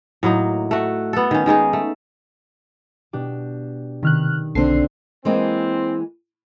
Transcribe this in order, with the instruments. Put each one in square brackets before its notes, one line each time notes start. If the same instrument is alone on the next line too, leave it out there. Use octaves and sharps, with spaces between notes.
[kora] A2 F#3 A#3 D#4
A3 F#4
B3 A4
D#3 C#4
D#3 G#3 D#4 G#4
A3
[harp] B2 D4 G4
[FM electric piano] C3 F6 F#6 [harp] D#3
[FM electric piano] B1 C7 [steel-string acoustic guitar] D3 C4 D4
[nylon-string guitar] E3 G#3 A#3 [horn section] C4